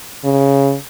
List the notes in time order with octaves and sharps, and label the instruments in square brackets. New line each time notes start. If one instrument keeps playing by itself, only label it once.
[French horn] C#3